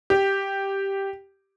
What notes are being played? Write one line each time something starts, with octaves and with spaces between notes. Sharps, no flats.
G4